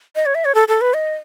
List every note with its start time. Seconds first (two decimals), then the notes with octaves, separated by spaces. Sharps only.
0.16 D#5
0.26 C#5
0.35 E5
0.45 C#5
0.55 A4
0.68 A4
0.81 B4
0.94 D#5